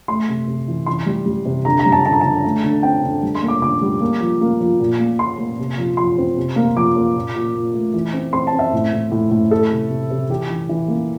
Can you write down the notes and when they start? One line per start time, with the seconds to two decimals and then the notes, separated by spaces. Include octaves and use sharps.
0.08 A3 C6
0.29 C3
0.47 C3
0.68 E3
0.86 E3 C6
1.06 G3
1.26 G3
1.45 C3
1.65 D3 A#5
1.79 A#5
1.86 G3
1.92 A5
2.04 D3 A5
2.13 A#5
2.21 D3 A5
2.44 A3
2.64 D3
2.83 C4 G5
3.04 D3
3.23 G3
3.35 C6
3.42 A#3
3.48 D6
3.62 D3 D6
3.82 G3
4.01 A#3
4.20 F3
4.41 A#3
4.60 F3
4.79 A#2
4.99 A#3
5.19 A#2 C6
5.38 A#3
5.59 C3
5.78 F3
5.97 F3 C6
6.18 C4
6.38 C3
6.56 A#3
6.76 F3 D6
6.96 A#3
7.16 A#2
7.36 A#2
7.55 A#2
7.74 A3
7.94 E3
8.13 C4
8.33 C4 C6
8.47 A5
8.53 C4
8.59 E5
8.73 A2
8.93 A2
9.11 A2
9.31 A2
9.51 A3 A4
9.71 C3
9.90 C3
10.10 C3
10.29 E3 G4
10.50 E3
10.69 E3
10.88 A#3